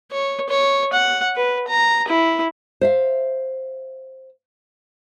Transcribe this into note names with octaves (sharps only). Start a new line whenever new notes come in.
C#5
C#5
F#5
B4
A#5
E4
C5 E5 F5